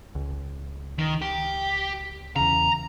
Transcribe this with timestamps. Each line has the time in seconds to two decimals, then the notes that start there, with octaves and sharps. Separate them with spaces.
0.15 C#2
0.99 D#3
1.22 G4
2.36 E2 C#3 A#5